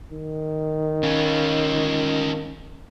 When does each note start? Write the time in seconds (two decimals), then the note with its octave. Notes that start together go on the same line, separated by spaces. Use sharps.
0.12 D#3
1.04 C#4 F4